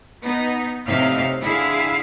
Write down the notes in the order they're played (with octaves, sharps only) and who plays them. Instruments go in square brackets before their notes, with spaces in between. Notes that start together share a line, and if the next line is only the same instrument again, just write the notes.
[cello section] B3 D#4
A2 C3 D#4 E5 F5
D3 E4 G#4 E5 F5